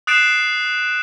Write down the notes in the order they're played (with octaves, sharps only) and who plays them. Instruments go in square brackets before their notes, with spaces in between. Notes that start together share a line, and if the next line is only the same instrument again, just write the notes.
[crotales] D#6 F#6 A6 C7 D7 E7